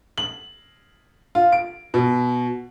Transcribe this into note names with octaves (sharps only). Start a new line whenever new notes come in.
F#7
F4
D7
B2